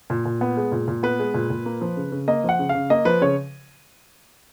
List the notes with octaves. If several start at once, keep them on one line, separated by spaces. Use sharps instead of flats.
A#2
A#2
B3
G#3
A#2
A#2
B3 B4
G#3
A#2
A#2
A#3
F3
C#3
C#3
A#3 D#5
F3 F#5
C#3
F5
C#3
A#3 D#5
F3 B4
C#3 C#5